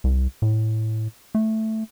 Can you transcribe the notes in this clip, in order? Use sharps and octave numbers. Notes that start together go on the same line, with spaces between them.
C2
A2
A3